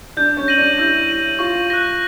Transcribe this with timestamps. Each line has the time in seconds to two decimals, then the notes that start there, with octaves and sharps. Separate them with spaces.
0.17 D4 G6
0.37 C#4
0.48 A#6 D#7 F#7
0.58 D4
0.78 E4 G6
1.09 A#6 D#7 F#7
1.39 F4 C#6
1.70 F#6 A#6